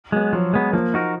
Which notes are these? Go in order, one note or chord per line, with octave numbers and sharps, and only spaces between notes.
F#3 G#3 B3
F3 F#3
G#3 B3
F3 A#3
D#4 F#4 A#4